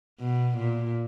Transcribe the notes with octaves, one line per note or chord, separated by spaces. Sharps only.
B2
A#2